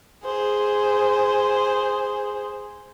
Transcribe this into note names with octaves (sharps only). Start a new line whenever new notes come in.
G#4 C5